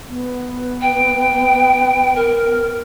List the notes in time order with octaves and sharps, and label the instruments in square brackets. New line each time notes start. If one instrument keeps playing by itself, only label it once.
[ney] B3
[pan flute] G5
A#4